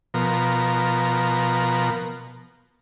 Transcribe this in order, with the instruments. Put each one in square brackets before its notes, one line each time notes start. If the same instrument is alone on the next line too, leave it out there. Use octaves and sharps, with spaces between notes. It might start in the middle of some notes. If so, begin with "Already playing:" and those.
[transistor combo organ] B2 F3 A#4